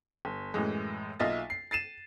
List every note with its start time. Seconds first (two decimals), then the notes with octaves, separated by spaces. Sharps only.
0.25 G1
0.54 F#2 A2 E3 G#3
1.20 B1 A#3 F4 D#5 E5 A6
1.50 C7
1.71 A6 C7 D#7 E7